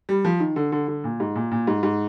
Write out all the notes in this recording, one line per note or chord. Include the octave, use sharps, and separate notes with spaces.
G3
F3
D#3
D3
D3
D3
A#2
G#2
A#2
A#2
G#2
G#2